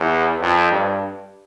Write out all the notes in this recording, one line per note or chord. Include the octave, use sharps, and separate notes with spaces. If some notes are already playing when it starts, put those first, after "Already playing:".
Already playing: E2
F2
G2